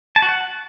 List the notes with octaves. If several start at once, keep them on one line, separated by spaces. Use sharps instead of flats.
A5
F#4
F#5